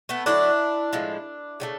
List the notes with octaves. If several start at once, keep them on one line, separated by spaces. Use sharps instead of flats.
A3 B3
D3 F#3 A3 D4 E4
A2 F3 G#3
C#3 F#3 A3